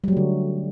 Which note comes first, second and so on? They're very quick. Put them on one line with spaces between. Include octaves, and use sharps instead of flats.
G3 F#3 A3 D3